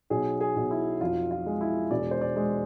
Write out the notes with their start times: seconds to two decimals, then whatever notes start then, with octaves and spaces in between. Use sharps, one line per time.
0.10 B1 G#4
0.41 G#4
0.56 B1
0.71 E4
1.01 F2 F4
1.31 F4
1.46 G#3
1.61 E4
1.91 E1 D5
2.11 C5
2.21 D5
2.36 G#3